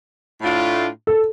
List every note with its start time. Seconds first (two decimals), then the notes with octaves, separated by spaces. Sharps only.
0.41 A2 A3 D4 F4
1.07 A4